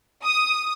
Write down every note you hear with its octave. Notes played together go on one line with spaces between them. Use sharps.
D#6